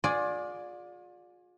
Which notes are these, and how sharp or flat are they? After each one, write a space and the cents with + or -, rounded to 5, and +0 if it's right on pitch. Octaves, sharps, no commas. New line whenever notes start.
F4 +40 G#4 +0 D5 +0